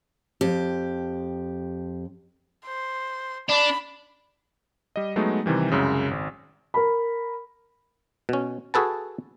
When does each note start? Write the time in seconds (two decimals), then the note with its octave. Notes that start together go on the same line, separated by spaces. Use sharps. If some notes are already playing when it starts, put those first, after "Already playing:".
0.41 F2 G4
2.66 C5
3.49 D4 B5
4.96 G3 D#5
5.16 F#3 G#3 A3 B3 D#4
5.46 C3 D#3 E3 G3
5.71 C2 F#2 C#3 G#3
6.11 G#1
6.74 A#4 B5
8.29 B2 C#4
8.74 F#4 G#4 A4 B4 A5